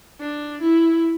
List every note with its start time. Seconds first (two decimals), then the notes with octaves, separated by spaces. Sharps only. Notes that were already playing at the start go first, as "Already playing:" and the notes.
0.20 D4
0.62 E4